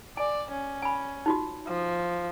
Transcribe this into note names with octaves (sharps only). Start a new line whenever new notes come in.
D5 G#5
C#4
G#5 B5
D#4 F4 F#4
F3